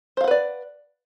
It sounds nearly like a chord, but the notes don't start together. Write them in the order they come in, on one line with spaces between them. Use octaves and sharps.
C5 F5 F#5 B4 D5